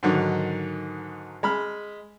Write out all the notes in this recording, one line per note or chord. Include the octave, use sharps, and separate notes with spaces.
G#2 D3 D#3 F#3
G#3 B5 F6